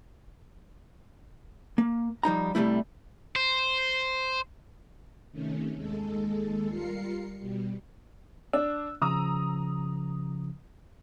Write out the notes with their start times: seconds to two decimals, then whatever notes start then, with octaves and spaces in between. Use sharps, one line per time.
1.78 A#3
2.23 F3 G3 D#4 A#5
2.55 C3 F#3 G3 A3 E4
3.36 C5
5.32 C3 D#3 A3 C#4
5.74 D#2 G#3 A4
6.67 G3 F4 A#4 C7 C#7
7.39 B2 G3
8.53 D4 E6
9.02 C#3 F3 A#5 D#6 E6